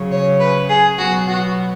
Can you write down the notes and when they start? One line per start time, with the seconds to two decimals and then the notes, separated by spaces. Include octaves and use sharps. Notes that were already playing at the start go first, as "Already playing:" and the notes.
Already playing: C#3 F#3 C#4
0.12 C#5
0.40 B4
0.69 G#4
0.98 B2 F#3 B3 F#4
1.29 F#4